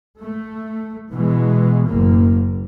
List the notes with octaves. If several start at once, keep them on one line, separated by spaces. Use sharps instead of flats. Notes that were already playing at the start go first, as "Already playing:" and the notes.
A3
B2 E3 G#3
F#1 A2 A#3